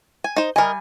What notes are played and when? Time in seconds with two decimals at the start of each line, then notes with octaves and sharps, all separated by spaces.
0.24 G#5
0.36 D#4 C5
0.56 G3 A#4 D#5 G#5